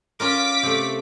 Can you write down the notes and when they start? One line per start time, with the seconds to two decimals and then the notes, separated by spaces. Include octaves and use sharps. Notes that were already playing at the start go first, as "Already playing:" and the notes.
0.20 C#4 F4 A#4 D6 B6
0.63 C3 A3